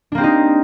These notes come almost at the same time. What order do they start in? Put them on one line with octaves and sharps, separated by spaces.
D4 A#3 C4 G4 D#4